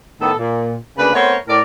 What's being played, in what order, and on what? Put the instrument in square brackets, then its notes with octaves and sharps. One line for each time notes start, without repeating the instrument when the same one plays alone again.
[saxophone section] A2 D#3 B3 A4
A#2
D2 C#3 A#3 D4 B4
A3 B3 C4 A#4 C5 C#5
A2 A#4 D5